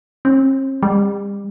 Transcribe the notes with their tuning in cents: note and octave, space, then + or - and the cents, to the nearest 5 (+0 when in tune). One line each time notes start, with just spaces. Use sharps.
C4 +45
G3 +40